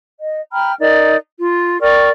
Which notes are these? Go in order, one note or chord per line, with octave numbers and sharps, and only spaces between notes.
D#5
G5 A#5 B5 F6
D#4 A#4 D5
F4
A#4 D5 G5 C#6